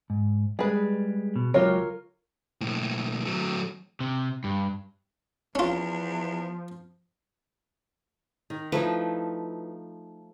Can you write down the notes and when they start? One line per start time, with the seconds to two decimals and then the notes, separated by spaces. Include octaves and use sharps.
0.10 G#2
0.59 G3 G#3 G#4 B4
1.36 B2
1.54 C#2 F#3 F4 G4 A#4 C#5
2.61 B1 A2
3.26 F#3 A3
4.00 C3
4.44 G2
5.55 E2 F3 C#4 F4
8.50 D#3
8.72 F3 A3 D#4 E4 B4